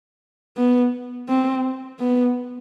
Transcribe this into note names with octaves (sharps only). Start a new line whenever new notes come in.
B3
C4
B3